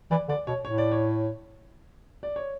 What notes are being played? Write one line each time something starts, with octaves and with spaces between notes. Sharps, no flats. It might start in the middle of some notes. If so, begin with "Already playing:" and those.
E3 D5
D3 D5
B2 C#5
A2 C#5
D5
C#5
D5
C#5